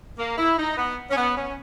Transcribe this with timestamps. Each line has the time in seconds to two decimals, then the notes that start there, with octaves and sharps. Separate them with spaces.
0.18 A#3
0.38 E4
0.57 D#4
0.77 B3
1.11 C#4
1.17 B3
1.36 C#4